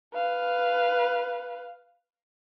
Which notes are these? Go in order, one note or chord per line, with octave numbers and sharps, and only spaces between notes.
B4 F5